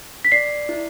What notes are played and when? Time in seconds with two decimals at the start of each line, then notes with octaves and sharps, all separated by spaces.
0.25 B6
0.32 D5 C7
0.69 E4